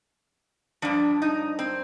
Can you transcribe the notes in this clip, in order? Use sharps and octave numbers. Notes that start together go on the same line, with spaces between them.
G2 F3 D4
D#4
C4